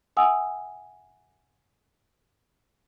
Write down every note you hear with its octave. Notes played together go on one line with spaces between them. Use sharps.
E5 F#5 G#5 D#6 E6